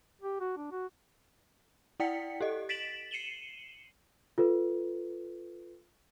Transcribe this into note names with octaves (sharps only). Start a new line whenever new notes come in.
G4
F#4
D4
F#4
E4 D5 F#5 G5 B6 C#7
G4 A4 D#5
A6 B6 D7 E7 F#7
C7 C#7 D#7 E7 F#7 G7
F4 A4 B4